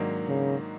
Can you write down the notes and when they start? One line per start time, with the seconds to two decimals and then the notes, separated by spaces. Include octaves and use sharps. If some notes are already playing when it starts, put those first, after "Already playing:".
Already playing: G#2 D#3 F#3 A#3 D4
0.28 C#3